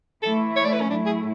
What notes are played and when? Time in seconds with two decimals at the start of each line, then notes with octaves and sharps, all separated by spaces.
0.22 E3 A3 E4 A4
0.56 C#5
0.65 D5
0.73 B4
0.81 C#4
0.89 A2 F#3 A3 D4 E4
1.06 G#4